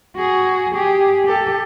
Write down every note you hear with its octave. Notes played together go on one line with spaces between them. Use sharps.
F#4 G#4
G4 G#4
G4 A4